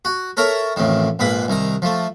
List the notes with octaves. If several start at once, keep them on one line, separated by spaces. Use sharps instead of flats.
F#4
A4 A#4 C#5 E5 A#5
A1 F2 A2 D#3
A#1 G#2 A#3 B4 B5
C2 D#3 A#5
F3 A3